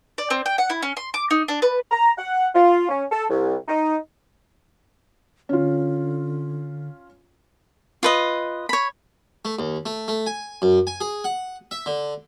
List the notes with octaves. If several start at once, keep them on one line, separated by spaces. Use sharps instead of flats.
D5
C4
G5
F#5
E4
C#4
C6
D6
D#4
D4
B4
A#5
F#5
F4
C#4
A4
C2
D#4
D3 C#4 F4
F4 B4 D#5
C#5 B5
A3
D#2
A3
A3
G#5
F#2
G#5
G#4
F#5
E5
D3